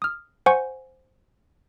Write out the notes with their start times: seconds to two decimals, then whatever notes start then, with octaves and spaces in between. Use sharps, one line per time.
0.02 D#6 F6
0.46 C5 F#5 G#5 C#6 C#7